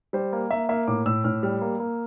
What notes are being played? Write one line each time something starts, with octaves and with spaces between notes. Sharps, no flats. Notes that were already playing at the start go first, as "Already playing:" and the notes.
G3 C5
A#3
A#3 E5
A#3 E5
A2 D6
A2 E6
A2 F6
G3 F6
A#3
A#3